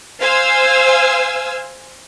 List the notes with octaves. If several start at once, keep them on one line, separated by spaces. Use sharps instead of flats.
C5 F5 G#5 E6